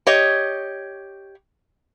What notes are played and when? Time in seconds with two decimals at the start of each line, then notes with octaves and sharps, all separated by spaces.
0.07 G4 C#5 D#5